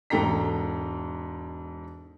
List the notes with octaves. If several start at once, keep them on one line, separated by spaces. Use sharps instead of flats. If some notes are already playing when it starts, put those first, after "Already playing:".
E1 G#2 A4 G5 A#5 B6